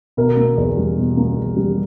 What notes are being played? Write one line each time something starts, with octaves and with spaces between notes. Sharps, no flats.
B2 A#4
A#3
E2
G3
B2
A#3
E2
G3